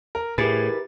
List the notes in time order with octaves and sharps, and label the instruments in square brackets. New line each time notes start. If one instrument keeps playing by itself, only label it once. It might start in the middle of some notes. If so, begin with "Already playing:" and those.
[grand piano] A#4
[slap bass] A2 [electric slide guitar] E4 A#4 B4 [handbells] G4 A6 [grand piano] G#4